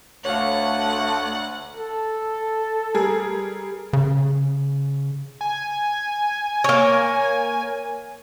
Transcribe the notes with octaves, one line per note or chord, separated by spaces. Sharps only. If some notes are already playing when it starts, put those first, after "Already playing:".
D2 A3 C#5 F5 F#5
A4
G3 G#4 A#4
C#3
G#5
A#3 C#5